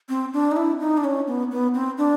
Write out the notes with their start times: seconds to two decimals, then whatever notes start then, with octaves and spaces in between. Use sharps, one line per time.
0.09 C4
0.34 D4
0.52 D#4
0.57 E4
0.80 D#4
0.97 D4
1.04 C#4
1.27 B3
1.51 B3
1.74 C4
1.98 D4